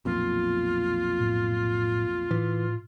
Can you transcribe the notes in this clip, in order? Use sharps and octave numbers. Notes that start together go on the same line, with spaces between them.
B1 F2 A#2 F4
A2
A2 E3